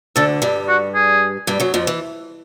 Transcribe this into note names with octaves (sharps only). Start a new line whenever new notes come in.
D2 D3 A4
G2 G3
F#4
G#4
G2 G3
F#2 F#3
F2 F3
E3